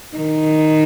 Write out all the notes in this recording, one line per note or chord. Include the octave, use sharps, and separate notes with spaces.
D#3